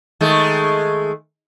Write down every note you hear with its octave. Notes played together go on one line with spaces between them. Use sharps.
D#3 G#3 A3